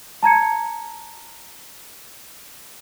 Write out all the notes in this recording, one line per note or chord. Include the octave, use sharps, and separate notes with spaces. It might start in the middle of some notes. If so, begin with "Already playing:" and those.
A5 A#5 G#6 C#7